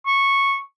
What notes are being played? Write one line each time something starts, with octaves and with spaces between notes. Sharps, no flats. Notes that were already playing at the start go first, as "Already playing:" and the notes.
C#6